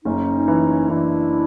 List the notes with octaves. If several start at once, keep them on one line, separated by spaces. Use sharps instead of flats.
F#1 C#4 D#4
E3
E3 D4 E4